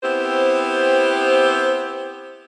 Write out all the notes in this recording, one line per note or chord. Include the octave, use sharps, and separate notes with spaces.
B3 C4 E4 G4 C5